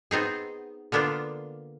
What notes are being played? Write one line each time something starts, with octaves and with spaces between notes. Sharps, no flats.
B3 C4 D#4 G#4
D3 A#3 B3 D4 F4